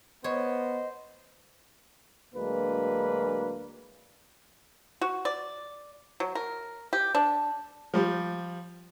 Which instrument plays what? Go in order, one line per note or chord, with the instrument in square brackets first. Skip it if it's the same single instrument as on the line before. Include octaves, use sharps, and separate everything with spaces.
[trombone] B3 [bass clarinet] C5 [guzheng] C#5 [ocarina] D#5
[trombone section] D2 F#3 G#3 A#3 D4 B4
[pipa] F#4
D5
F#3
A#4
G4
D4
[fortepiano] F3 G3